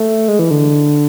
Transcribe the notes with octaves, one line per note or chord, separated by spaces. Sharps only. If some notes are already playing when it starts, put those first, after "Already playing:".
Already playing: A3
G#3
E3
D3